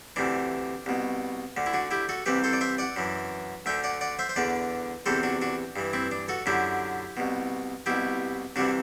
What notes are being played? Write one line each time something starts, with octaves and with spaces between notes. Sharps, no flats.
D2 C3 E3 D4
C2 B2
D2 D3
E4
D4 F#4
E4 G4
F#4 A4
C2 C3 E3 G4 B4
A4 C5
D5
C5 E5
D5 F#5
F#2 E3
D2 D3 E5 G5
D5 F#5
D5 F#5
C5 E5
C5
E2 D3 B4 D5
E2 C3 E3 A4 C5
D4 F#4
D4 F#4
G2 E3
C4 E4
D4
F#4 A4
F#2 D3 E4 G4
C2 B2
C2 B2 E4 G4
C2 C3 E3 D4 F#4